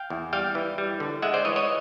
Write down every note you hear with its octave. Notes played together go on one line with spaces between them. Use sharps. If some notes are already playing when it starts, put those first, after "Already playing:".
Already playing: F5 G5
E2
G3 F5 G5
E3
G3
D3
G#3 E5 F#5
C5 D5
E3 C#5 D#5
C#5 D#5